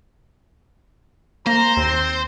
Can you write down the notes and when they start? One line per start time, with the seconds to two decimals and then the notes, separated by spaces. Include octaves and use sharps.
1.47 A#3 C5 A#5
1.77 D#2 C4